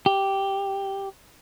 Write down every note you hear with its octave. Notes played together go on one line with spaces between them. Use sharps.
G4